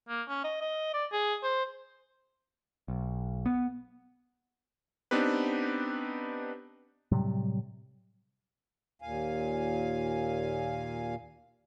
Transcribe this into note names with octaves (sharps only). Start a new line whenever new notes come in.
A#3
C#4
D#5
D#5
D5
G#4
C5
B1
B3
B3 C4 D4 D#4 G4 B4
A2 C3 F#3 G3
D#2 A#2 F5 G#5